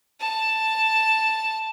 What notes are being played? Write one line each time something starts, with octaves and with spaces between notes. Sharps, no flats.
A5